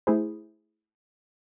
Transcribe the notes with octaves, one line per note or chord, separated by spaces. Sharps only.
A3 E4 G#4 C5